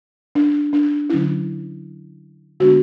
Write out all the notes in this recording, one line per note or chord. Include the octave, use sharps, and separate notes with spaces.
D4
D4
D3 F#3 C#4 E4
D3 G#3 B3 D4 F#4